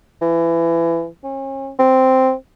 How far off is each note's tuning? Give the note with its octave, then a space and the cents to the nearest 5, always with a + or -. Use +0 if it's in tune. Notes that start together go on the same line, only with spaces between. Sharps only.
E3 +25
C#4 -40
C4 -5